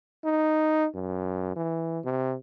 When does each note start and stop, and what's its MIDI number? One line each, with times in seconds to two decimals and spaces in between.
0.24 0.87 63
0.95 1.55 42
1.56 1.99 52
2.05 2.35 48